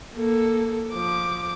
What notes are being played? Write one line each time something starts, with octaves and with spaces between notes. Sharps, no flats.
A#3 A4
F3 D6